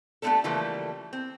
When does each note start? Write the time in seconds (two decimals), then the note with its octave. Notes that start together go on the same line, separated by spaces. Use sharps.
0.22 G3 A3 B3 C4 D4 A4
0.44 C#3 E3 F3 G3 A3 A#3
1.13 C4